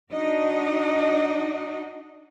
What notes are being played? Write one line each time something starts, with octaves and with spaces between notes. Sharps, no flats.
D4 D#4 F#4 D5 D#5